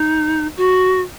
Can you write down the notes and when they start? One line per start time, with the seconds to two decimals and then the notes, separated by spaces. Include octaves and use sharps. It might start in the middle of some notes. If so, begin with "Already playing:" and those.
Already playing: D#4
0.57 F#4